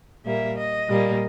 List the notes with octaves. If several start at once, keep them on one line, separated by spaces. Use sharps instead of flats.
A#2 G3 A#3 E5
D#5
A#2 G3 A#3